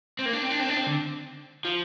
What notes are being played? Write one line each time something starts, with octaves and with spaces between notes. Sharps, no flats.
C4
A#3
D4
C4
D4
C4
D4
C4
D3
F3